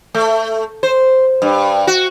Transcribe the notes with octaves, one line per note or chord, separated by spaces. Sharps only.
A3
C5
G2
F#4